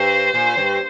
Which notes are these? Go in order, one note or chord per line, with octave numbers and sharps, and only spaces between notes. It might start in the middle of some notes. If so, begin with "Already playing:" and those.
Already playing: G2 C5
A#2
G2